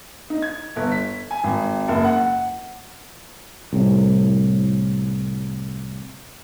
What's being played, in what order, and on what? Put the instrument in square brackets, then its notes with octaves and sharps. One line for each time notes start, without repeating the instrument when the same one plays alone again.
[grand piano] D#4
G#6
G1
B6
G#5
G#1
F#1
F#5
[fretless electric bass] C2 A2